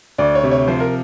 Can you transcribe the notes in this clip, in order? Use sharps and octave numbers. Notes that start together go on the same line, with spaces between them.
D2 D5
C#5
C3
C#5
F3 C5
A#4